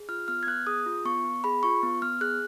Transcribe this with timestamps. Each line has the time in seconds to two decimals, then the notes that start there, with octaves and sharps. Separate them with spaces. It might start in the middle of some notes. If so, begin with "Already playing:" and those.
Already playing: G#4
0.09 F4 F6
0.28 B3 F6
0.43 G#6
0.47 B3 F#6
0.67 G#4 D#6
0.86 F4
1.05 B3 C#6
1.24 B3
1.44 G#4 B5
1.63 F4 C#6
1.83 B3
2.02 B3 F6
2.21 G#4 F#6